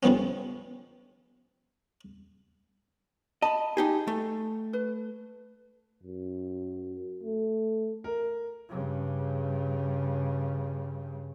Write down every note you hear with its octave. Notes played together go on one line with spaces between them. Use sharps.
D3 F3 G3 B3 C#4
D#5 A5 B5
D#4 G4 G#4
A3
B4
F#2
A3
A#4
G2 C#3